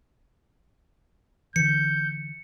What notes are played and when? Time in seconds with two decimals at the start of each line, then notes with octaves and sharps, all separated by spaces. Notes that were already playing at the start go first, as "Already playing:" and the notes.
1.56 D3 E3 G6 C#7